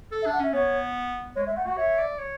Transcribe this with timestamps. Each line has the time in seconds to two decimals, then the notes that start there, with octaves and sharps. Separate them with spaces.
0.12 A4
0.22 E5
0.26 D4
0.33 F#5
0.39 C#4 E5
0.53 B3 C#5
1.36 G#3 C#5
1.46 G#3 E5
1.57 A3 F#5
1.67 F#4 F#5
1.77 C#5 E5
1.98 D5
2.18 C#5